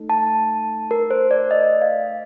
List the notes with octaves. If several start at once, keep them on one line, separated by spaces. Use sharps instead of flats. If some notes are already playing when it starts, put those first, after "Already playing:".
Already playing: A3 D#4 A4
A5
A#4
C5
D5
D#5
F5